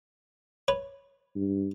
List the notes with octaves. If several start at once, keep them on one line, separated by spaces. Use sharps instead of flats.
B4 C#5
G2